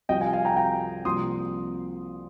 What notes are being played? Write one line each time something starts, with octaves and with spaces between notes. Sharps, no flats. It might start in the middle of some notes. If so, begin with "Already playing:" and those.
C2 C3 F3 D#5 G5
F5 G#5
F5 G#5
G5 A#5
G5 A#5
C2 C3 F3 A#3 C6 D#6